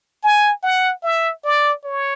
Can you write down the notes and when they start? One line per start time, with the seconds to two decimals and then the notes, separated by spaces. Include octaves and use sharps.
0.23 G#5
0.63 F#5
1.04 E5
1.44 D5
1.84 C#5